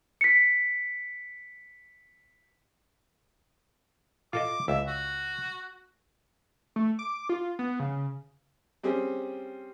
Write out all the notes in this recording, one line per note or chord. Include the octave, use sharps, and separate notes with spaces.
B6 C#7
F4 A4 D#5 D6
C#2 E5
F#4
A3
D6
F4
B3
C#3
G3 C4 C#4 G#4